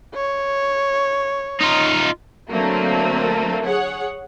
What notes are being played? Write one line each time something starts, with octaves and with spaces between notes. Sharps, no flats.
C#5
D#4 F4
D3 F#3 A3 A#3 C4
G#4 C#5 F#5